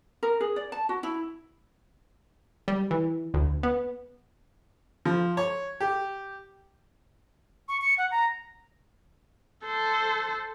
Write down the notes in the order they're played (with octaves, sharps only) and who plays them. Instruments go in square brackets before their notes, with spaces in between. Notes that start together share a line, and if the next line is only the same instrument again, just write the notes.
[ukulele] A#4
G#4
D5
A5
F#4
E4
[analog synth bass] G3
E3
D2
B3
[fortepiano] F3
C#5
G4
[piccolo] C#6
C#7
F#5
A#5
[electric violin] A4 C5